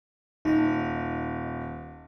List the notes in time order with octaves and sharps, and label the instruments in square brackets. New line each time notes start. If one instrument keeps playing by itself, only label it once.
[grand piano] D#1 [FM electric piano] D#4 D#5